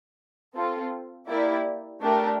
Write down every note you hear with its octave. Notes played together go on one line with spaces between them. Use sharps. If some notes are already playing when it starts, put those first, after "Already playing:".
C4 F4 A4
A#3 E4 G4 D5
A3 D4 G4 A#4